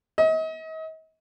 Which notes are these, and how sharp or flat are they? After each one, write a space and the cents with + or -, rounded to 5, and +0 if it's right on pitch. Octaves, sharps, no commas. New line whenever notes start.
D#5 +40